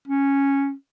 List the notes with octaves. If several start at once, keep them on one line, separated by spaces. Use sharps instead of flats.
C#4